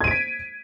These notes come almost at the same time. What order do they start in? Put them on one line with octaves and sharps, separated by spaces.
G#6 D#7 D7 B6